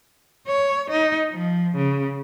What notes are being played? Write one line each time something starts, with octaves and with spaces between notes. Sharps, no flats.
C#5
D#4
F3
C#3